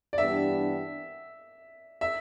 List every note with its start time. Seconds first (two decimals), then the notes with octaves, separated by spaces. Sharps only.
0.13 D5
0.18 G2 E3 B3 D4 G4 E5
2.01 E5